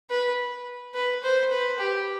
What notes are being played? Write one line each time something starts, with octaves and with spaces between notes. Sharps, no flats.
B4
B4
C5
B4
G4